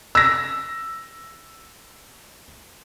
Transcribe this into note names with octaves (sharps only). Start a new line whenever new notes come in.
E6 A#6